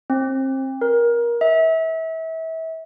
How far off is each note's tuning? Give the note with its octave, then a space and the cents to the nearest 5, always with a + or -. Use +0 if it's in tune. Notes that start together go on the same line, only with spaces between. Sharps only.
C4 +30
A#4 +20
E5 -30